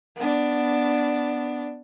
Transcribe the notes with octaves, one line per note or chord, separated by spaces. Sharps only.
B3 D4